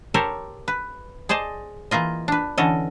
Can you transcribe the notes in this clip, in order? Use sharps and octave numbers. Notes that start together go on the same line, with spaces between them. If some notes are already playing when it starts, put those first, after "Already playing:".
G4 A4 A#4 C5 C#5
B4
G#4 C5 D5 D#5 A5
E3 A#3 F4 D#5
D4 B4
D3 E3 C#4 A4 D#5